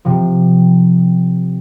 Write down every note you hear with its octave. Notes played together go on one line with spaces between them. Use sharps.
C3 F3